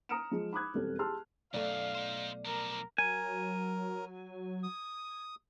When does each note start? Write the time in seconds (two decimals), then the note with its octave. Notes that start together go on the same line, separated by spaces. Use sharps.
0.09 A#5 D#6 F6 C#7 D7 E7
0.31 F3 G#3
0.53 B5 D6 D#6 F#6 G#6
0.74 E1 F2 G3 A4
0.99 G4 G#4 A5 C6 E6 F6
1.54 B1 F#2 A3 D5 F5
1.95 D#4 C5
2.45 F3 D4 A#4
2.98 F#3 A#4 G#5
4.63 D#6